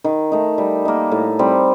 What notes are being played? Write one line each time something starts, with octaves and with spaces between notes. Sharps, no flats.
D#3
A3 D#4
G3
A#3 D#4
A2
G3 C4